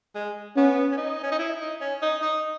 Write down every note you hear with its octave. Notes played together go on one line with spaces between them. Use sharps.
G#3
B3 C#4
C#4
D#4
C#4
D#4
E4
D#4
C#4
D#4
D#4